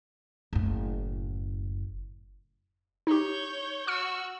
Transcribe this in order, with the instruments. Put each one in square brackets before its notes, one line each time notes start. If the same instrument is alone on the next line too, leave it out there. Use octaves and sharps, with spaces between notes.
[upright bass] F#1 A2
[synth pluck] D#4 G4 [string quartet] C#5 G6
[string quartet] F#4 E6 [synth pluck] C#6 F6 C#7